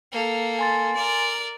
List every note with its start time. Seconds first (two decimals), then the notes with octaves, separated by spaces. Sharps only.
0.12 A#3 A4
0.59 G#5 C6 A6
0.96 A#4 D5